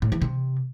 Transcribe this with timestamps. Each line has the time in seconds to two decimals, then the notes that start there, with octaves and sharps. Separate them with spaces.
0.02 A2
0.12 E3
0.22 C3